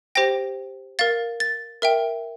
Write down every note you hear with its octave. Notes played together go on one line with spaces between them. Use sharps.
G4 C5 G5 A#6
A#4 F5 A6
A6
A#4 E5 G5